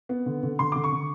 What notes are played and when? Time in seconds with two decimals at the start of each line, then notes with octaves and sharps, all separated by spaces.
0.09 B3
0.26 D3
0.43 D3
0.59 D3 C6
0.72 D3 D6
0.84 C#6
0.92 D3